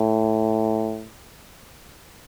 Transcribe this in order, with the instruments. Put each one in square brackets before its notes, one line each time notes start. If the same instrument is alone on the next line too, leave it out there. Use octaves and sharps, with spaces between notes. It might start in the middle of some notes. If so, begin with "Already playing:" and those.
Already playing: [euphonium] A2